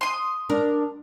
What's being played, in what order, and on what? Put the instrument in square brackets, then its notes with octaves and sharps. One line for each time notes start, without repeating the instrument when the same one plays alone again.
[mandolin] C6 D#6
[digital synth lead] D4 [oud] A#4